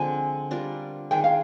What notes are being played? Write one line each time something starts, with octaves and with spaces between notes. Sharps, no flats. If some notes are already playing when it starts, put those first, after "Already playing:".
Already playing: D3 F3 G#3 C4 G#5
G3 D4 F4 A#4
D#3 G#3 D4 G#4 G5
F5